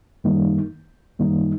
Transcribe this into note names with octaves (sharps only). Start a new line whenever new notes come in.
F#2 D#3 G3 A#3 D#4
F#2 D#3 G3 A#3 D#4